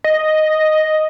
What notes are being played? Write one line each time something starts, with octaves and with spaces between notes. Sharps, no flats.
D#5